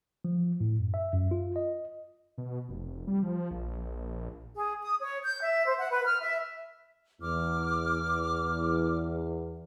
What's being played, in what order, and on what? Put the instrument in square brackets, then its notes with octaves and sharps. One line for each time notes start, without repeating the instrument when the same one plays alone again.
[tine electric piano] F3
A2
F#2
E5
F#2
F4
D#5
[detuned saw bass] B2
F1
G3
F3
A#1
[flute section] G#4
D#6
C#5
G6
E5
C5
F#5
B4
F6
E5
[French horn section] E2 [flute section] D6 F6